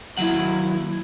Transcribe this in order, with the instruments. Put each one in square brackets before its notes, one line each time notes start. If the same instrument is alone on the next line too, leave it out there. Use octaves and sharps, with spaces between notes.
[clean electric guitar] D#2 F#3 F#5 [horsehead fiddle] E4